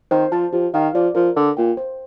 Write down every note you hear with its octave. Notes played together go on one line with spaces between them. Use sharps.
D#3 C5
F3 A5
F3 G4
D#3 F5
F3 D5
F3 A#4
D3 A#4
A#2 G5
C5